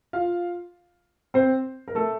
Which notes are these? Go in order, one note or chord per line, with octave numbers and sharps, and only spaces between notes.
F4 F5
C4 C5
A#4
A3 A4